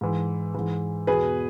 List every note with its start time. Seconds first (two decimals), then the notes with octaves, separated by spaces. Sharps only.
0.01 G#2 E3
0.55 G#2 E3
1.07 E2 B2 G#4 B4